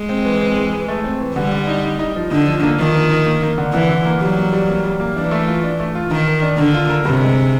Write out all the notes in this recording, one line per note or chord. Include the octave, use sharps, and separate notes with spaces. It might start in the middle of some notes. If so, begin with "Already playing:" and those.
Already playing: G#3
C4
E3
C4
E3
E3
A3
C4
E3
D3 G3
D3
D#4
D#4
D#4
F3
D3 D#4
F3
A#3
D#3 F3
F3
D#4
A#3
A#3
D3
D3 E3
D3
A#3
F#3 G3
A#3
G3
A#3
G3
A#3
E3 D4
A3
F4
D4
A3
F4
D#3 A#4
A#4
D4
D3 A#4
F4
A#4
G2 C3
G#3